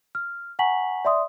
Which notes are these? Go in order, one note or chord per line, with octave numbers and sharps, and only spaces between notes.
F6
F#5 G#5 A#5 C#6 B6 F#7
D5 E5 C6 D#6